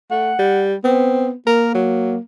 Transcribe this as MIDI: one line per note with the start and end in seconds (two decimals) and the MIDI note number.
0.11 0.32 57
0.11 0.63 78
0.39 0.75 55
0.84 1.33 59
0.84 1.29 60
1.47 2.19 58
1.47 1.71 70
1.75 2.15 54